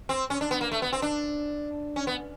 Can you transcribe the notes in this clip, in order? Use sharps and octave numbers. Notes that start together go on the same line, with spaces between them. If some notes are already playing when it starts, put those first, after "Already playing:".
C4
C#4
D4
B3
A#3
A3
B3
C4
D4
C#4
B3